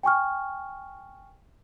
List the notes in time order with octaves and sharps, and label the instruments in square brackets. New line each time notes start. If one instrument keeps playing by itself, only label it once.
[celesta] G5 G#5 C#6 F6